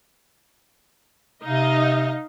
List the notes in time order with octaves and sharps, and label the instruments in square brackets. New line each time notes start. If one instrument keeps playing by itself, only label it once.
[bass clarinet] C3 [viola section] D#4 D#5 F5